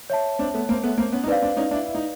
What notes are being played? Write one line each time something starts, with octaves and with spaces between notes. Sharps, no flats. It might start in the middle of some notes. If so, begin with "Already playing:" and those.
C#5 E5 A5
C4 D4
A3 B3
A#3 C4
A3 B3
A#3 C4
B3 C#4
D#4
C4 D4 B4 D5 F5
C4 D4
C#4 D#4
D4 E4
E4
D#4